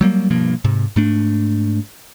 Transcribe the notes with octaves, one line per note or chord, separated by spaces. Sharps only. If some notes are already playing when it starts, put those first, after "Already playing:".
F#3 G3 A#3
G2 B2 F3 A#3
G#2 C3
G#2 A3 D4